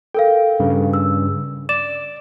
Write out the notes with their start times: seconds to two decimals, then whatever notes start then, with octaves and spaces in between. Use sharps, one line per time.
0.14 A4 A#4 F5 G5
0.60 G2 C#3
0.93 E6
1.69 D5 E7